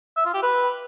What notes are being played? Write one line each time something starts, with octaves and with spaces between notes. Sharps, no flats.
E5
F4
G4
B4